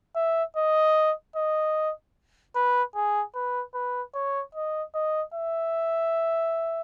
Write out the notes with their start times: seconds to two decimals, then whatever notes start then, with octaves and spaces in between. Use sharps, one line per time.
0.16 E5
0.57 D#5
1.36 D#5
2.55 B4
2.95 G#4
3.35 B4
3.74 B4
4.15 C#5
4.55 D#5
4.95 D#5
5.34 E5